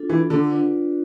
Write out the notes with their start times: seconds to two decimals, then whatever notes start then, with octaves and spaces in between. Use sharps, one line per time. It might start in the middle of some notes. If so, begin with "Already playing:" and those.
Already playing: D4 F4 A4
0.09 E3
0.30 D3
0.50 D4 F4 B4 D5